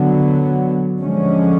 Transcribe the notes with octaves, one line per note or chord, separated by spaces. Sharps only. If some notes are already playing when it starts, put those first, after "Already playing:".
Already playing: D3 F#3 B3
D3 F3 G#3 C#4